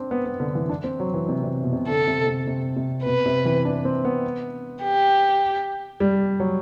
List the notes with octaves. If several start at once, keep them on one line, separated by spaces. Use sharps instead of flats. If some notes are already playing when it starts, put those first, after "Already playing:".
Already playing: C4 D4
B3
B3
D3
E3
D4
C4
F#3
E3
C3
C3
B2
C3
D3 A4
C3
C3
C3
C3
B2 B4
C3
E3
D4
C4
B3
G4
G3
F#3